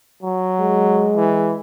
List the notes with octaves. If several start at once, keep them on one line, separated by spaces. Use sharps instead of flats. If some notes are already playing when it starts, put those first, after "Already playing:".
F#3
G#3
E3